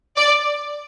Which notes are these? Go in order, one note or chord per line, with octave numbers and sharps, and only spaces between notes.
D5